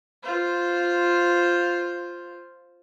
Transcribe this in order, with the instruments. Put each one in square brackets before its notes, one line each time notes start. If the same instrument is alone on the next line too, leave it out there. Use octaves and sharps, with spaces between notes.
[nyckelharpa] F4 C5